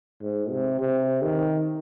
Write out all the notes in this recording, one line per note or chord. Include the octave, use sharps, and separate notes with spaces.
G#2
C3
C3
D#3